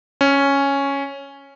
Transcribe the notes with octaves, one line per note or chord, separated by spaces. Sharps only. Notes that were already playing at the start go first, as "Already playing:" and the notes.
C#4